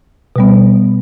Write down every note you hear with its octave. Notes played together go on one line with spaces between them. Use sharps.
B2 G3 B3